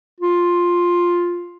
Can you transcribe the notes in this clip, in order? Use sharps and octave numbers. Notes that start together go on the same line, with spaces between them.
F4